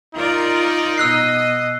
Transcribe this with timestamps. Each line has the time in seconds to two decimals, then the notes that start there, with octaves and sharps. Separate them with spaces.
0.15 D#4 F4 A#4 D5
0.98 B2 D#5 E6 F#6 C7